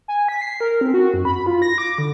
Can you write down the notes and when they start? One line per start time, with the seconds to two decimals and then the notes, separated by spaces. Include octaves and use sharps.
0.08 G#5
0.29 B6
0.42 C7
0.60 A#4
0.81 C4
0.94 F#4
1.14 F#2
1.25 B5
1.46 F4
1.62 A#6
1.78 D6
1.98 D3